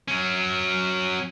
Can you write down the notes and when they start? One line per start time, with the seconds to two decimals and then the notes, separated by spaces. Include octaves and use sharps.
0.08 F#3 C#4